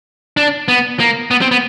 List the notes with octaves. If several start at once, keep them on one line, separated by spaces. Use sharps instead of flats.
D4
B3
A#3
B3
C4
B3